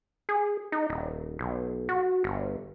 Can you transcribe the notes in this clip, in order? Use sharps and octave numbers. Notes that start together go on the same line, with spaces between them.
G#4
D#4
D#1
B1
F#4
G1